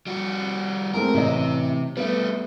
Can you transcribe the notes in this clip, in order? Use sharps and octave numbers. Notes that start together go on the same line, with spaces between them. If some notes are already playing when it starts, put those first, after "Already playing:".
G3 F#4
G#3 A3 C4 A#4
A1 C3 E3 D#5
G3 A3 B3 E5